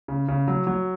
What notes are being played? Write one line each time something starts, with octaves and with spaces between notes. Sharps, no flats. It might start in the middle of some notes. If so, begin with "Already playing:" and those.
C#3
C#3
F#3
F#3